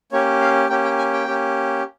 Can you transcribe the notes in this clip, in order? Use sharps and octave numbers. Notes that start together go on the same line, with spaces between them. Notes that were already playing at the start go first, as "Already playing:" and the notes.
A#3 C#4 G4 C#5
F5
A#3 C#4 G4 G5
G5
G#5
G5
A#3 C#4 G4